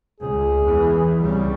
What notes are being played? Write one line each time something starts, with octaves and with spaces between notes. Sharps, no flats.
C#2 G#4
E2 E3
C2 C#3 G3